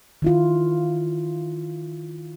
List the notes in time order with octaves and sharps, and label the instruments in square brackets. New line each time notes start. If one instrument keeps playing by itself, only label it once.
[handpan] D#3 E4 F4